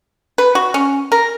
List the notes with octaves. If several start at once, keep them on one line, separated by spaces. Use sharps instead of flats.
B4
F#4
C#4
A#4